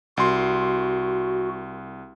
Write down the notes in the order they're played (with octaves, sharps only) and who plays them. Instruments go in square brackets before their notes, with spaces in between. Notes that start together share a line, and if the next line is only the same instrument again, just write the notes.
[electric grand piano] C2 C6 [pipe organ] F#4